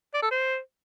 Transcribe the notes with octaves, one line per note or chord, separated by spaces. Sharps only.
D5
A4
C5